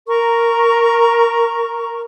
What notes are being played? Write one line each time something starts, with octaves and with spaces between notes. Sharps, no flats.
A#4 A#5 C#6